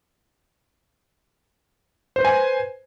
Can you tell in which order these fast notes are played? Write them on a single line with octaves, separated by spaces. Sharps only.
C5 B4 G#5